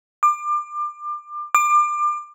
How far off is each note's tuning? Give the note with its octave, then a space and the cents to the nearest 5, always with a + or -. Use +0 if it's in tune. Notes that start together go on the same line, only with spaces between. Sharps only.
D6 +30
D6 +30